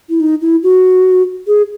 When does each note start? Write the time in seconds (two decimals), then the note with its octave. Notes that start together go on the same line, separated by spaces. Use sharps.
0.09 E4
0.20 D#4
0.41 E4
0.63 F#4
1.47 G#4